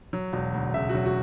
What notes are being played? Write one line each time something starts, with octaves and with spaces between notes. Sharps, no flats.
F#3
E1
D2
C#3 E5
F#4
F#3
F#4